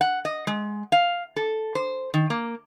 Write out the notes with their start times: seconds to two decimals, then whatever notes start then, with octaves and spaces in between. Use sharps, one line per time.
0.01 F#5
0.25 D#5
0.47 G#3
0.92 F5
1.36 A4
1.75 C5
2.14 D#3
2.30 A#3